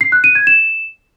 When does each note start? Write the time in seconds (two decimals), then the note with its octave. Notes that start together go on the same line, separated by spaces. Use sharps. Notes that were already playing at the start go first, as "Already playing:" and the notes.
0.01 C7
0.12 F#6
0.24 D#7
0.35 G#6
0.47 E7